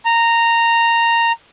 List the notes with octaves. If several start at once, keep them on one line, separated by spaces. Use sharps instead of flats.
A#5